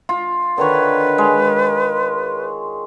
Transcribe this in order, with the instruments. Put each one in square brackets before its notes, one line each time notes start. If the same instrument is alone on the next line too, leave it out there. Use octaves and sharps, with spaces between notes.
[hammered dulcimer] F4
[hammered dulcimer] D3 D#3 C#5 [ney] B4
[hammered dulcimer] G#3